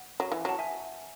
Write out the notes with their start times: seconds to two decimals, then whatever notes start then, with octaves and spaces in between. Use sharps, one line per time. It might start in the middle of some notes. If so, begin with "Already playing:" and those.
Already playing: F#5
0.20 F#3
0.32 E3
0.45 F#3 F#5 A5
0.59 E5 G#5